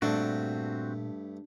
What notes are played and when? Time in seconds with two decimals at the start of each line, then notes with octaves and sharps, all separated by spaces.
0.02 G2 A#2 A3 C4 D4 F#4